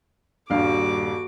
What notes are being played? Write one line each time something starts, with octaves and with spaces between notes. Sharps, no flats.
D#1 G2 F#4 F5 D6